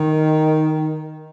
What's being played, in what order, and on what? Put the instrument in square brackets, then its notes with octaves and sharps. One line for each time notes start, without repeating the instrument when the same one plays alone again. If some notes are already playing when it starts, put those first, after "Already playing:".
Already playing: [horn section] D#3